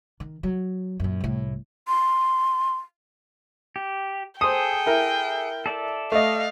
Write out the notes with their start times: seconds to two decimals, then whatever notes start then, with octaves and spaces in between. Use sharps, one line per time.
0.20 D#3
0.43 F#3
1.00 F#2 A#2
1.21 C2 A2
1.88 C6
3.76 G4
4.41 G#4 A4 C5 G5 D#6
4.86 E4 A#4
5.66 A4 D5 E5
6.12 A3 D#5 F5